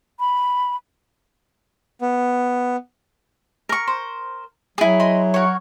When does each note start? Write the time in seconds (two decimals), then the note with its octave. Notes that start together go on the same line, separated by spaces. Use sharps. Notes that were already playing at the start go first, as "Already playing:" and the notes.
0.20 B5
2.01 B3
3.69 A#4 C#6
3.88 C5
4.78 F#3 E4 G#4 G#5
5.00 D#5 B5 C6
5.34 F#4 A#4 C#5